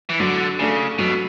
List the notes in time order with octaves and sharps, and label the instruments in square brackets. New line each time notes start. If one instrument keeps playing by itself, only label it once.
[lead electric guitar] E3
[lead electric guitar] D3 [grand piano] F#3
[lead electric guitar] C#3 [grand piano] A3 D4 A4
[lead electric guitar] B2 [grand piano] F#3